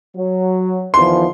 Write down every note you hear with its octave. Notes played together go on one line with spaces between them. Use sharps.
F#3
E2 D#3 F3 C6